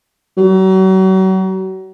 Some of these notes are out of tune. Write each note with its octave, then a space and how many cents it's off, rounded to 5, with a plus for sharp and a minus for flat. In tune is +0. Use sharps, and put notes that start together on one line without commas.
F#3 +35